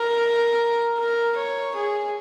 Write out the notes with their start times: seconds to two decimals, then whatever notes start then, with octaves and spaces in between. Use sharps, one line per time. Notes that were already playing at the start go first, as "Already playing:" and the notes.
Already playing: A#4
0.98 A#4
1.37 C#5
1.75 G#4